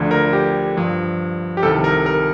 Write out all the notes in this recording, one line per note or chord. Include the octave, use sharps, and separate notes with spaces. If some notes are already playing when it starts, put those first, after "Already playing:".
Already playing: D2 D3 F3
A#4
G4
G2 F3
G4
C2 C3 D#3 A4
A#4
A#4